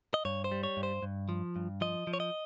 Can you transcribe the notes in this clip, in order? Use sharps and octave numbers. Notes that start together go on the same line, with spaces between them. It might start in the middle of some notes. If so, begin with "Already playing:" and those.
D#5
G2 C#5
C5
G3
C#5
G2
C5
G2
F3
G2
F3 D#5
F3
C#5
D#5